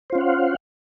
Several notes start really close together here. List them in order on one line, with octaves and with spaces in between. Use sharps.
C5 F4 C#4 F#5 F5